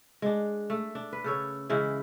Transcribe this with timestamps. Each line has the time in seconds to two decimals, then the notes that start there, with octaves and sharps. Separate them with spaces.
0.22 G#3 D4
0.70 A3
0.95 D4
1.13 B4
1.24 C#3 A4 C#5
1.70 C#3 E3 G#3 E4